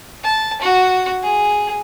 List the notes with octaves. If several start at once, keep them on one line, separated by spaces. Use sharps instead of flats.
A5
F#4
G#4